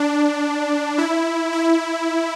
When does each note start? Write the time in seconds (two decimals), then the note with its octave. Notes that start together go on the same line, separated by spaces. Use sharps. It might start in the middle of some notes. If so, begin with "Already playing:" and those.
Already playing: D4
0.98 E4
1.53 E4